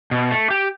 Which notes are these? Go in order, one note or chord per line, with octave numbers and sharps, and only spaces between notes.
B2
A3
G4